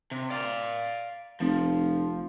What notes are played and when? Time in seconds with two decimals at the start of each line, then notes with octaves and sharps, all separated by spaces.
0.11 C3
0.30 D5 F5
1.40 F1 F3